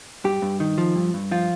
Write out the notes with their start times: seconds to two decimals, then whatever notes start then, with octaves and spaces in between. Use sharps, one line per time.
0.24 G2 G4
0.42 G2
0.60 D#3
0.78 F3
0.95 G2
1.14 G2
1.31 F3 F4